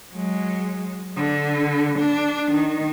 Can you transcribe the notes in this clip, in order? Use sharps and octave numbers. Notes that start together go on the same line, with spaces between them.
F#3 G#3
D3
D4
D#3